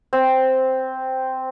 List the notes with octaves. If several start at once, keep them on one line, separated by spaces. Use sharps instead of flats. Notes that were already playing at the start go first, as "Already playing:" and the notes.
C4